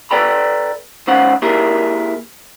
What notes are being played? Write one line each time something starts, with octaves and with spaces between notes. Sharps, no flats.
A4 B4 D5 G5 A#5 B5
G#2 C#4 C5 F5 F#5
A#3 E4 G4 G#4 A#4